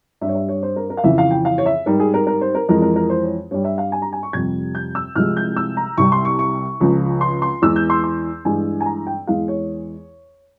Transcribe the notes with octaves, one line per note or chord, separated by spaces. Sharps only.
G2 G3 E5
C#5
E5
C#5
C5
A#4
A#4
F5
F2 C#3 E3 E5
F5
G5
F5
C#5
E5
G#2 G3 A#4
G#4
A#4
A#4
C5
A#4
F2 E3 G#3 A#4
A#4
A#4
C5
C#5
G2 G3 C#5
E5
F5
G#5
A#5
G#5
C#6
F2 C3 G3 G#6
G6
E6
C2 C3 F3 G#3 F6
G6
E6
A#5
C2 C3 G3 C#6
C6
C#6
C#6
C#2 C#3 F3
C6
C6
E2 E3 G#3 E6
G6
C6
C6
G2 E3 G#3 G#5
G#5
A#5
G5
E2 E3 G#3 F5
C#5